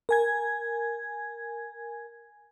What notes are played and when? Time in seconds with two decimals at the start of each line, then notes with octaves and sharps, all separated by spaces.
0.09 A#4 G#5 G#6